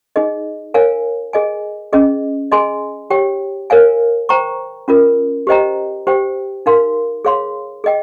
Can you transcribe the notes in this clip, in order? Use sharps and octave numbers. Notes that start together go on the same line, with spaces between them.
D#4 G#4 D#5
A#4 C#5 F5 G#5
G#4 D#5 G#5
C#4 G#4 D#5
G#4 D#5 G#5 C6
G4 C#5 G5
A#4 C#5 F5 G#5
C5 G5 A#5 C#6
C#4 F4 A#4
G4 C5 D#5 G5 A#5
G4 C5 G5
D#4 A#4 F5 C6
G#4 C#5 F5 C6
G#4 D#5 G5